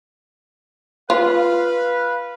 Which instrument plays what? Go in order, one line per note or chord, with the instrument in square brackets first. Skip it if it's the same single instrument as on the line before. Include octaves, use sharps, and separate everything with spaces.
[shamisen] F4 [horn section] B4 F5